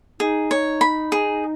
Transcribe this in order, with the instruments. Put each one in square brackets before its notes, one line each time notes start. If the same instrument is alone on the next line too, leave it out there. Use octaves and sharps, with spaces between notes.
[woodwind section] D#4 [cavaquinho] G#4
[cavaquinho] C#5
B5
G#4